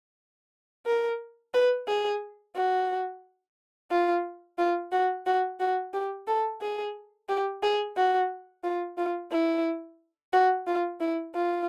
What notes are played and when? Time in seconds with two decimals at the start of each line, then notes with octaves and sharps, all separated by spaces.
0.86 A#4
1.54 B4
1.88 G#4
2.55 F#4
3.91 F4
4.58 F4
4.92 F#4
5.26 F#4
5.60 F#4
5.93 G4
6.28 A4
6.61 G#4
7.29 G4
7.63 G#4
7.97 F#4
8.64 F4
8.98 F4
9.32 E4
10.33 F#4
10.67 F4
11.00 E4
11.35 F4